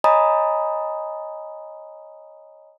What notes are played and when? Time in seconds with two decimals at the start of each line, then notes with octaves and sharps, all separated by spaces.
0.04 C#5 D#5 G#5 A#5 B5 D#6